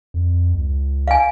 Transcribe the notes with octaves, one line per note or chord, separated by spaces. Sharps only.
F2
C#2
F5 G#5